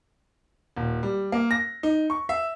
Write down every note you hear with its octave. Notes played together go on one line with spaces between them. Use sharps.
D#1
G3
A#3
A#6
D#4
C#6
E5